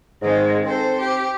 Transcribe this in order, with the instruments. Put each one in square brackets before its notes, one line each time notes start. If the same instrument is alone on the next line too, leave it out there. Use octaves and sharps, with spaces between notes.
[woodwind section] G#2 [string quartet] D#3 G#3 C4
[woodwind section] C4 [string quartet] A4 C5
[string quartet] G4